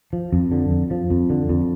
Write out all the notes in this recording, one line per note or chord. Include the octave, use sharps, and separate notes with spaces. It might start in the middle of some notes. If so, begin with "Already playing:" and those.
F3
F2
D3
F2
F3
F2
D3
F2